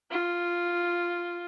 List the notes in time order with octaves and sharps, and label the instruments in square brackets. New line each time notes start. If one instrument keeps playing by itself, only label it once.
[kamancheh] F4